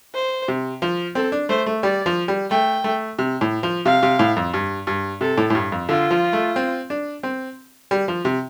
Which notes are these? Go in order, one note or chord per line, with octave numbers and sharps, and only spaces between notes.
C5
C3
F3
C4 A4
D4
A3 C5
A3
G3 D5
F3
G3
A3 G5
A3
C3
A2
F3
C3 F5
C3
A2
F2
G2
G2
C3 A4
A2
A2
G2
F2
D3 F4
F3
A3
C4
D4
C4
G3
F3
C3